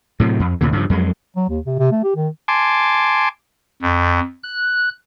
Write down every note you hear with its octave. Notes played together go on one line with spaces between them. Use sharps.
A2 C3 F#3
F2
D2 A#2 C#3
G2 C#3 F3
F2 F#3 G#3
F#3
D#2
C3
C3
A3
G4
D#3
G#5 A5 C6 D6
F2
F#6